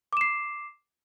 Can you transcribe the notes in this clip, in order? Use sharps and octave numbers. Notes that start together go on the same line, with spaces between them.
D6 C7 E7